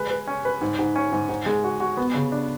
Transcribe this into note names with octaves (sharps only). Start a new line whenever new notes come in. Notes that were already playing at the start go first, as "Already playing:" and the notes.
Already playing: G#3 B4
B4
C#4
B4
G#2
G#2
C#4
G#2
G#2
G#3
F#4
F#4
B3
C#3
D4